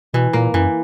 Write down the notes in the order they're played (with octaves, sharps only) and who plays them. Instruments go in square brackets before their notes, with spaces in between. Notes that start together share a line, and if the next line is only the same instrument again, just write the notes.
[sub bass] B2 [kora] E3
[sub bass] A#2 [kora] A#3
[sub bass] F#2 [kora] E3